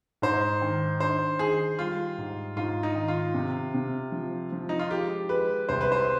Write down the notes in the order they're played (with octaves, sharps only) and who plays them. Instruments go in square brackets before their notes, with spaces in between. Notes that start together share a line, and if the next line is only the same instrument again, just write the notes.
[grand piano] G#2 [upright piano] C5
[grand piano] D#3
[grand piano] D4 [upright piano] C5
[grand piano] D#3 [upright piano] G#4
[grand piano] G3 [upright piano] F4
[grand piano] G#2
[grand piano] G#2 [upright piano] F4
[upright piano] D#4
[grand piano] D#3
[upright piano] F4
[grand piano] C3
C3
F3
F3
[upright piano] D#4
F4
[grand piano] G#3 [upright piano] G4
[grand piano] G#3 [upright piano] B4
[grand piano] C2 [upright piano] C5
[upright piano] B4
C5